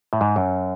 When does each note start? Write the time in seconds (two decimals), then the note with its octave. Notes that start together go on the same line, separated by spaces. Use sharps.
0.13 A2
0.21 G#2
0.36 F#2